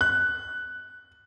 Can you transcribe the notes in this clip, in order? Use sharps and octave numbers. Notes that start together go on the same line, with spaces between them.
F#6